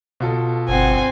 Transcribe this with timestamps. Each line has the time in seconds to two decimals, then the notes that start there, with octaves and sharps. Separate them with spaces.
0.20 B2 F4 A4
0.69 G1 C4 F#5 G#5